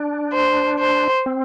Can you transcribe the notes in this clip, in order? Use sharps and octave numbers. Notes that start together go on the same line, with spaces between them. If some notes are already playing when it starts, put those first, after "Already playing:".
Already playing: D4
C5
C5
C4